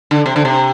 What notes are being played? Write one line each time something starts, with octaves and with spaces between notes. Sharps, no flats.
D3
C3
D3
C3